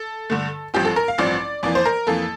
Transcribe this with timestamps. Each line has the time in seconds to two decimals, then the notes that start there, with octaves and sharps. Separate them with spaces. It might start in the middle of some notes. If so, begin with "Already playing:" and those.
Already playing: A4
0.30 G2 D3 A3
0.74 A1 G2 F3 C4 G4
0.85 A4
0.96 A#4
1.08 F5
1.18 A1 G2 F3 C4 D5
1.63 F2 E3 A#3 D5
1.75 C5
1.85 A#4
2.07 F2 E3 A#3 A4